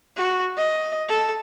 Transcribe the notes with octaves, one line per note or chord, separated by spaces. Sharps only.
F#4
D#5
A4